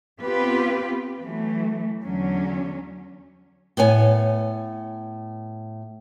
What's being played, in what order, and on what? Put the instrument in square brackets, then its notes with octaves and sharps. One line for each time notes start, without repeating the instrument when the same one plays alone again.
[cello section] B3 C4 F4 G4 B4
E3 F#3 A3
E2 D3 F#3 C#4
[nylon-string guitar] A2 B3 C#5 G#5